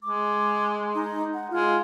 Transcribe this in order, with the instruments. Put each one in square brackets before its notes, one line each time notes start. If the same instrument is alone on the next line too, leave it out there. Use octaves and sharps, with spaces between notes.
[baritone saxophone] G#3 [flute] D6
[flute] D#4
F#5
[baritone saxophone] G#3 [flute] F4